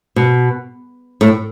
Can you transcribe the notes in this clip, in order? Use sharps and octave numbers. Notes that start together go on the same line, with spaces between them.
B2
A2